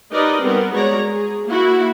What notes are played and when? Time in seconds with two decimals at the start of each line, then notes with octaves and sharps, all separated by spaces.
0.12 D#4 G4 A#4 B4 D5 D#5
0.42 G3 B3 C4 A#4
0.73 G#3 F#4 C#5 D5 A#5
1.09 G#4
1.46 A#3 E4 F#4